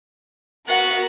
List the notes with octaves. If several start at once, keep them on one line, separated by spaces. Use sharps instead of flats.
B3 F#4 A#4 F#5